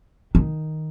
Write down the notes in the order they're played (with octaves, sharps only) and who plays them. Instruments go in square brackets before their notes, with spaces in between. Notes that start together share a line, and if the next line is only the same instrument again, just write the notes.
[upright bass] D#3